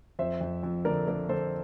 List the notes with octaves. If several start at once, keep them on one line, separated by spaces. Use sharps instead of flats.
F2 C5 E5
F2
F2
D3 A#4 D5
D3 A#4 D5
D3 A4 C5